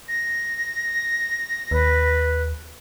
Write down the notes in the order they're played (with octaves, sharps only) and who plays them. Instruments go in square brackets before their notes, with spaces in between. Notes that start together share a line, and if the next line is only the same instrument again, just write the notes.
[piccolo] A#6
[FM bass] D#2 [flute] B4